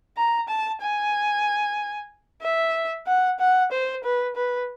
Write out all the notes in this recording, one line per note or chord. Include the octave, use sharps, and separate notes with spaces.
A#5
A5
G#5
E5
F#5
F#5
C5
B4
B4